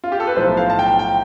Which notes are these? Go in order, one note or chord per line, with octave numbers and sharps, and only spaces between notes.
F4
G4
A4
B4
B1 A2 F3 C5
F5
A5
G5
G5